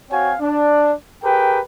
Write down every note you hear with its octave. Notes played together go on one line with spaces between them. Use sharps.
C4 F#4 C#5 F5 G5 G#5
D4
G4 G#4 A#4 B4 G5